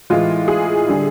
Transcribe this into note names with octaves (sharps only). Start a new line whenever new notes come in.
A2 E3 G#3 F4
G#4
D3 G3